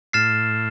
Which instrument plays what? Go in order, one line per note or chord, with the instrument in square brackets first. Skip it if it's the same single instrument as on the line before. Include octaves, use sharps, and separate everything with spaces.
[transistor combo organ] A2 [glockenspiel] F6 A6 C7 E7